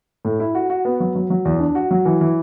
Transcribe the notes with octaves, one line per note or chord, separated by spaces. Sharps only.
A2
E4
F#4
F#4
B3
F#3
F#3
F#3
E2
D4
F#4
F#3
E3
E3